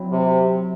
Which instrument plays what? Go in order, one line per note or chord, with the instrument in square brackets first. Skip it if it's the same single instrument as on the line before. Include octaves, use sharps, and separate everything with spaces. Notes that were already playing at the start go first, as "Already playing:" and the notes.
Already playing: [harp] F#3 C4 E4
[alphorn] C3